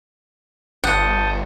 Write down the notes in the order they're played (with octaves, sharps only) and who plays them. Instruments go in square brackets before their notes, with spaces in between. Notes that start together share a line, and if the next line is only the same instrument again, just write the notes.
[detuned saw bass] G1 [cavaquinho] F#5 [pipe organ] A5 D#6 G6